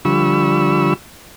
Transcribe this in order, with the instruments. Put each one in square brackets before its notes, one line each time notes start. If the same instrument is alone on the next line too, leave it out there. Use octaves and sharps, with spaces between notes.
[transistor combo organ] D3 F3 G3 B5 C#6 E6